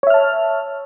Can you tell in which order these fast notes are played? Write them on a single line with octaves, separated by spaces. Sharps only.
C#5 E5 F6 A5